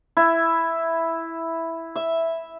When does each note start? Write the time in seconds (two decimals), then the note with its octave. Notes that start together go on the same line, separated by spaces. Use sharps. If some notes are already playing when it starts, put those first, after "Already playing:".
0.17 E4
1.96 E5